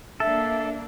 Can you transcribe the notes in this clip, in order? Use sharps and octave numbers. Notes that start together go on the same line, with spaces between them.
A#3 D4 A4 E5